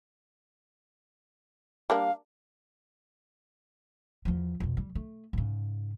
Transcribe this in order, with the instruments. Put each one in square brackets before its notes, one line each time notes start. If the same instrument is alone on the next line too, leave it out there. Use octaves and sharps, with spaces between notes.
[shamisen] G3 A#3 D4 [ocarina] F5
[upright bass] E2 F3
F2 B2
G3
A3
G#2 C#3